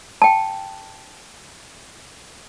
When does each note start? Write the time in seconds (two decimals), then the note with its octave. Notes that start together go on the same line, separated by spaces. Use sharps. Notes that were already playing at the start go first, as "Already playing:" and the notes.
0.22 G5 A5